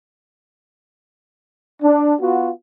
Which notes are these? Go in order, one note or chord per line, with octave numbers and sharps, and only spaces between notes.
D4
B3 F4 F#4